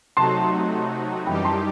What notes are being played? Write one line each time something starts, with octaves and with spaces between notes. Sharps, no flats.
C3 F#3 A3 D#4 F#4 A5 C6
F#2 E3 G3 D#4 G4 G5 B5
A5 C6